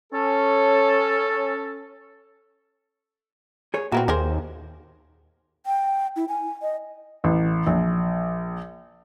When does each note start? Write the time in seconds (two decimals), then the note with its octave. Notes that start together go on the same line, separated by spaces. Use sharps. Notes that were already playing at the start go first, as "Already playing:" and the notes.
0.12 C#4 A4
3.74 G#4 C#5
3.92 A#2 E3 B3 C4 F#4 A#4
4.08 D#2 A#3 G#4 A#4 C5
5.66 G5
6.16 E4
6.29 G#5
6.62 D#5
7.24 A1
7.67 A#1